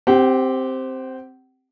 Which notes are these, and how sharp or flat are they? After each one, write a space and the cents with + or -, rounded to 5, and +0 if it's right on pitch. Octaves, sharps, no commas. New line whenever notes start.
C4 +0 G4 +0 F#5 +40